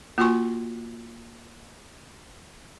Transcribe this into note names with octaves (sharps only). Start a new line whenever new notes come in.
A#3 F4 F#4 G#5 C6 C#6